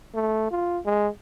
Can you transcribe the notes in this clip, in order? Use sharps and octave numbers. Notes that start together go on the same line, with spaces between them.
A3
F4
G#3